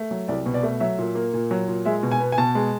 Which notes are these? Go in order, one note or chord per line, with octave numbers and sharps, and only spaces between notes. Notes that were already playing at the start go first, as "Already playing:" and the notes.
Already playing: A3
F#3
C2 D5
B2
D5
A3
F#3 E5
A#2
A#3
A#2
F#3
A#2
G#3 E5
B2
G#5
B3
G#5
B2 A5
G#3